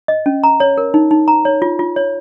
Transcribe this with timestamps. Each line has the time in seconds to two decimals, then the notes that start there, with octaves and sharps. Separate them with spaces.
0.08 D#5
0.26 C#4
0.44 A#5
0.60 C#5
0.78 A#4
0.94 D#4
1.11 D#4
1.28 A#5
1.45 C#5
1.62 F4
1.79 F4
1.96 C#5